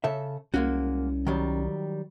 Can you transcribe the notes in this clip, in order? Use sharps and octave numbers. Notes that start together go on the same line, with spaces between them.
C#3 A4 E5
C2 G#3 A#3 C#4 F#4
D#3 F#3 G3